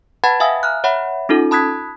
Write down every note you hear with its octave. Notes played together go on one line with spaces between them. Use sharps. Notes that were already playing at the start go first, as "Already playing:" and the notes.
B4 F#5 A5 B5 G#6 A6
E5 F5 G#5 D#6 E6
A#5 F6 F#6
C#5 E5 F#5 B5
C#4 D#4 F4 A4
A5 B5 D#6 F#6 G#6 B6